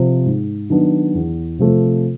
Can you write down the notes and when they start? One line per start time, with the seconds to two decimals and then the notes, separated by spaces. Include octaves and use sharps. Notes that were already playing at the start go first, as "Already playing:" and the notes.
Already playing: C3 F3
0.26 G#2
0.70 D#3 F#3 B3 D4
1.15 E2
1.59 C3 F3 A3